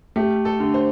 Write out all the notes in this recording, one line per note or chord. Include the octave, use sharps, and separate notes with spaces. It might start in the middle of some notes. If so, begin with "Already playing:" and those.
A3 G4
A4
D3
C5